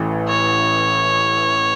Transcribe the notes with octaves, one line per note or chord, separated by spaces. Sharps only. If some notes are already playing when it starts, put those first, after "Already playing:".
Already playing: A1 A2 E3
C#5